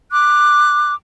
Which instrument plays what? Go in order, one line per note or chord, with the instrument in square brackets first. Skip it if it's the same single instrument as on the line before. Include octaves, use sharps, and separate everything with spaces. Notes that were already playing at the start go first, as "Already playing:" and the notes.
[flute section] D6 F#6